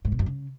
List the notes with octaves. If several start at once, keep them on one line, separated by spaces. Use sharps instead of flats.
G#2
B2
F#2
C#3